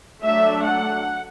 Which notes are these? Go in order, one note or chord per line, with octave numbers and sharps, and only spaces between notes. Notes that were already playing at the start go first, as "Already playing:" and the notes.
F#3 A3 D4 E5
F#5